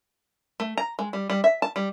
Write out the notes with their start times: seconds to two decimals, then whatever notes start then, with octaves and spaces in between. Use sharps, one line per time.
0.60 A3
0.78 A#5
0.99 G#3
1.13 G3
1.30 G3
1.44 E5
1.62 A5
1.76 G3